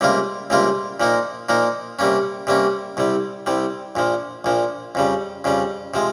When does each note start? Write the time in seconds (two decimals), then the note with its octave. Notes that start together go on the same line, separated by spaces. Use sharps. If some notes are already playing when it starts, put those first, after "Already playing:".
0.01 C#2 C3 G3 A#3 F4
0.50 C#2 C3 G3 A#3 F4
1.00 A#2 F3 A#3 D#4
1.49 A#2 F3 A#3 D#4
1.99 C3 G3 A#3 C#4
2.47 C3 G3 A#3 C#4
2.97 C2 C3 G3
3.46 C2 C3 G3
3.95 A#1 A#2 F3
4.44 A#1 A#2 F3
4.95 F2 C#3 G3
5.44 F2 C#3 G3
5.94 C3 F3 G#3